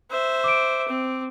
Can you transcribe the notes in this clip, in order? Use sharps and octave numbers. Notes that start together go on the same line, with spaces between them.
C5 E5
D6 D7
C4